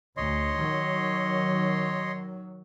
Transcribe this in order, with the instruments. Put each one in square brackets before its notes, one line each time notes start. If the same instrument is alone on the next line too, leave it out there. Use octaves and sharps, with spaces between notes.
[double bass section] D2 [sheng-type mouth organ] C#5 D#5 C6
[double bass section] D#3 F#3